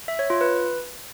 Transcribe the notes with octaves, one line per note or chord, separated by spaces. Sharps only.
E5
C#5
F4
B4